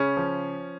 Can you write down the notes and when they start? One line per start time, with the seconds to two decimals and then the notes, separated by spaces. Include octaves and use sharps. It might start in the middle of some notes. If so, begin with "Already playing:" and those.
Already playing: C#3 C#4
0.17 F3